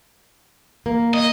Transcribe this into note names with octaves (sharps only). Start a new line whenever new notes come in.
A#3
D#5